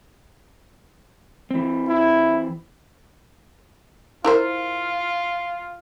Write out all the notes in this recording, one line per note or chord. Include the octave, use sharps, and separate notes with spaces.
E3 C4
E4
E4 F4 A#4 C5